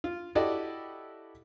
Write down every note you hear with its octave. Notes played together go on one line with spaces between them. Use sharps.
F4
E4 F#4 G4 A4 D5 D#5